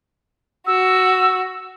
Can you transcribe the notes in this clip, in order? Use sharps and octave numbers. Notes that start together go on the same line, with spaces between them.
F#4 E6